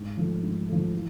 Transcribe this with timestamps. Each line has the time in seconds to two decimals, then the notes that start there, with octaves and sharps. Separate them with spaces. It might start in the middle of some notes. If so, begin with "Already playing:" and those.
Already playing: G#2
0.17 F3 A3
0.43 G#2
0.69 F3 A3
0.94 E3